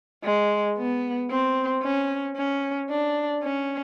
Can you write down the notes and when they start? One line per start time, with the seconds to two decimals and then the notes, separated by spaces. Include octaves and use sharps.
0.24 G#3
0.78 B3
1.31 C4
1.83 C#4
2.37 C#4
2.90 D4
3.43 C#4